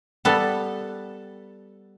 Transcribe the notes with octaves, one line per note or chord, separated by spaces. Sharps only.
G3 B3 A4